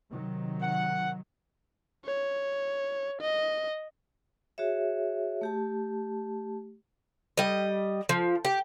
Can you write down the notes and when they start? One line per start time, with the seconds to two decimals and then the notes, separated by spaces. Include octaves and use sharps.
0.12 C3 D#3 F#3
0.60 F#5
2.05 C#5
3.21 D#5
4.58 F#4 G#4 C#5 E5
5.41 A3 G4 A5
7.37 G3 D#5
8.09 F3
8.45 G4